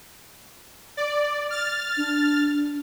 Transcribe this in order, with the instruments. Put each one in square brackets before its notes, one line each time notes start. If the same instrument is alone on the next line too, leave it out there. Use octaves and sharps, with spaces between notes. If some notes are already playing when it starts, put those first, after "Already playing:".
[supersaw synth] D5
F6 A6
[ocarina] D4